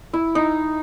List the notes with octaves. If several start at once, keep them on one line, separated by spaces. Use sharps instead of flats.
E4
D#4